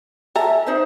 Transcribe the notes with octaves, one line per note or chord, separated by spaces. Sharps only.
A4 E5 G#5 A#5
D#4 C5 E5